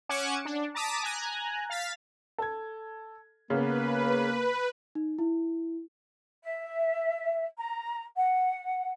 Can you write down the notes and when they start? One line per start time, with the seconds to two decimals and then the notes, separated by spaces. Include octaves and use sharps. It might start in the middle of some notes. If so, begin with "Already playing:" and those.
0.09 C#4 F#5 G#5 D6 C#7 E7
0.45 D4
0.75 A5 A#5 D6 D#6 B6
1.03 G#5 A#5 F#6
1.70 F5 A6 B6
2.38 A4 G#6
3.50 C#3 A#3 B3 B4
4.95 D#4
5.19 E4
6.42 E5
7.57 A#5
8.16 F#5